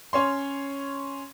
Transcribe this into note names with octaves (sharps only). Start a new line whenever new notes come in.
C#4 C#5 C6